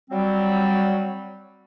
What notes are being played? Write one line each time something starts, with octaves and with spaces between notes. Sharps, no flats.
F#3 G3 C4